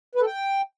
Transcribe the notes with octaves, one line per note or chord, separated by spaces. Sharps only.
B4
A4
G5